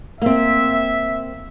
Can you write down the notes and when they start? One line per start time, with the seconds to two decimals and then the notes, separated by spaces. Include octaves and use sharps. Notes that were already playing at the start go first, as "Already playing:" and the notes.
0.22 A#3 C4 E5